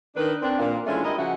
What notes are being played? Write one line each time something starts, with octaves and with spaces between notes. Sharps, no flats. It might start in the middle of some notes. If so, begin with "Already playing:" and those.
D#3 D4 B4
C4 D4
A#2 A#3
E3 G#3 A3 C#4 D4 F4
G3 E4 A#4 D#5
C#3 F3 F#4 E5 F#5